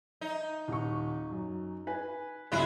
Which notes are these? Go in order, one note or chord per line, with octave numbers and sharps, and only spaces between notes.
D#4
D#1 C#6
F#2
B4 G#5
F#1 C#2 B2 G#3 E4